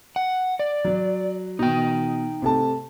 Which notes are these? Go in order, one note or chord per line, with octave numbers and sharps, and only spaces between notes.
F#5
D5
F#3
B2 D#4 G5
C3 A3 A5